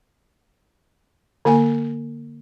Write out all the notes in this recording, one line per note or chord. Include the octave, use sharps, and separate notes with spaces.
D3 A#3 G#5